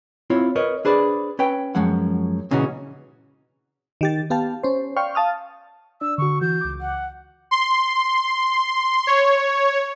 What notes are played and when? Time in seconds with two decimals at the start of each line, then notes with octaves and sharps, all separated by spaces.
0.30 C4 E4 F4 C#5
0.56 A#4 B4 C#5 D#5
0.85 D4 G#4 B4 C5 D5
1.39 C#4 B4 C#5 G5
1.75 F#2 F3 G#3 C#4 F#5
2.51 A#2 C#3 E3 C#4 D#4 F#4
4.01 D#3 G4 A6
4.30 B3 G4 F5 A5
4.63 C#4 C5
4.97 D5 F5 G5 C6 C#6 F6
5.15 F5 A5 D#6 F6
6.01 D4 D5 E6
6.18 D3 F#4 C#6
6.41 E3 F#4 G6
6.61 C#2 D6
6.81 F#5
7.51 C6
9.07 C#5